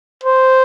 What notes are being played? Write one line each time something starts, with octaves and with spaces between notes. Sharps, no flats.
C5